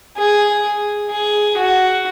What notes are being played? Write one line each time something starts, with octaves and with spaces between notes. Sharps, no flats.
G#4
G#4
F#4